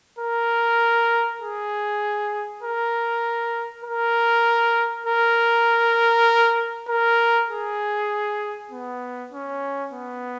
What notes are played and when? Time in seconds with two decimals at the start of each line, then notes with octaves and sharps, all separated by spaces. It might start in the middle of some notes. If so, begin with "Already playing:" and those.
0.19 A#4
1.41 G#4
2.62 A#4
3.84 A#4
5.06 A#4
6.88 A#4
7.49 G#4
8.71 B3
9.32 C#4
9.93 B3